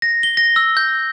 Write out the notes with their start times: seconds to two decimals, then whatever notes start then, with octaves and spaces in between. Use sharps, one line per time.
0.02 A#6
0.23 G7
0.37 A#6
0.56 E6
0.77 G6